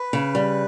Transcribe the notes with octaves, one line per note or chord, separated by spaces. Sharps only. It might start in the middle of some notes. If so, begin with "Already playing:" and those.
Already playing: B4
C#3
G3